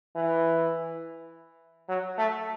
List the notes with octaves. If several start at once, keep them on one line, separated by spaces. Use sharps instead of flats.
E3
F#3
A3